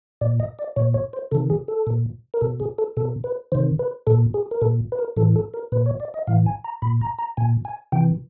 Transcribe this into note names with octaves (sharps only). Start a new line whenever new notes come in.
A#2 D5
D#5
D5
A#2 C#5
C#5
C5
C3 D#3 A4
G#4
A4
A#2
A#4
B2 A4
G#4
A4
B2 A4
B4
C3 D#3 C5
B4
A#2 A4
G#4
A#4
A#2 A4
B4
A#4
A2 E3 A4
A4
A#4
A#2 B4
C#5
D5
D#5
A2 E3 F5
G#5
A#5
A#2 B5
A#5
A#5
A#2 G#5
G#5
C3 E3 G5